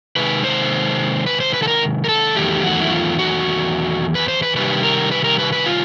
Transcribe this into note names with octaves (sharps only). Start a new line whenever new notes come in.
C3 D#3 G#3 B4
C5
B4
C5
B4
A4
A#4
A#4
A4
E2 C3 D#3 F#3 A3 G4
F#4
E4
F4
F#4
B4
C5
B4
C3 D#3 G3 B4
A#4
B4
A#4
B4
B4
F4